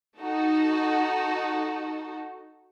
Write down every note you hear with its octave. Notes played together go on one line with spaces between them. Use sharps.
D#4 F#4 A4